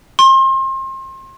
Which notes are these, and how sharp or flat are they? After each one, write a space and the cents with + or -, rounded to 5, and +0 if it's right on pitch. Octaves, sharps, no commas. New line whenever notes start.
C6 +35